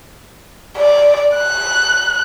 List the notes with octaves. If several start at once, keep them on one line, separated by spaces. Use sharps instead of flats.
D5
F#6